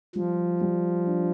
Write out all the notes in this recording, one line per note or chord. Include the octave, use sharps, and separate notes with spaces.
F3 G3
G3
D4